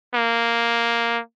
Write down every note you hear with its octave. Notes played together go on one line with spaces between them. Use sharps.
A#3